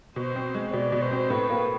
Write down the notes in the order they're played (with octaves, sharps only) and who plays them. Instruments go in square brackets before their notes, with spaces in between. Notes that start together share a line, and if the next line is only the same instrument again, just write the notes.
[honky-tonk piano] B2 [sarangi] C5
[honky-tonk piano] C4
G#3
[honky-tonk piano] B2 [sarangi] D5
[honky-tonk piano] B2
[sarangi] C5
[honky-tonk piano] C4
[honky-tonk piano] A2 [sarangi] B4
[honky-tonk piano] A#3